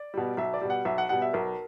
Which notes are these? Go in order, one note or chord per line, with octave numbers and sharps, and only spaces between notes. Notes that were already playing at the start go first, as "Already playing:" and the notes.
Already playing: D5
B2 G3
B1 E5
D5
B2 G3
F#5
B1 E5
F#5
B2 G3 F#5
E5
B1 A#4